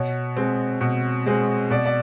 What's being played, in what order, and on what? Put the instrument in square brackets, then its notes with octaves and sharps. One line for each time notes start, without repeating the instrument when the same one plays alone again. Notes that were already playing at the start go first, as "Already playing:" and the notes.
Already playing: [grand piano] B2 C#5
G#3 C4
B2
G#3 C4
B2 D5
D5